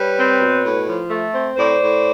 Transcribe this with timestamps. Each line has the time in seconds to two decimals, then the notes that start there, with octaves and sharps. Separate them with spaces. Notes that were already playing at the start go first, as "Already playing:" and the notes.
Already playing: G3 B4 C#5
0.17 C4
0.40 B2
0.64 A2
0.87 F3
1.10 A3
1.34 C4
1.57 A2 C5 D5
1.81 A2